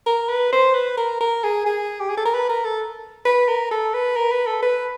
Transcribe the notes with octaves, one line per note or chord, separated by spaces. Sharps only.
A#4
B4
C5
B4
A#4
A#4
G#4
G#4
G4
G#4
A4
A#4
B4
A#4
A4
B4
A#4
A4
B4
A#4
B4
A4
B4